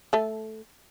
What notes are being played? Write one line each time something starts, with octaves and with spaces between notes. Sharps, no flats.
A3 A4